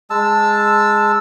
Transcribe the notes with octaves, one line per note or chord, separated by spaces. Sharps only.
G#3 A5 E6